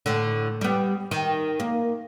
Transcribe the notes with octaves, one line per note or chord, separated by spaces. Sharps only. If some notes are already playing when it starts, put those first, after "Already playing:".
A2 D3
G3 B3
D#3
A#3